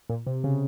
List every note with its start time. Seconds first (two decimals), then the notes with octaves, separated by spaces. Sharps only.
0.09 A#2
0.27 C3
0.44 C#3